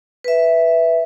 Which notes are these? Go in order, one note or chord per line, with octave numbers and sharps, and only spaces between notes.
B4 E5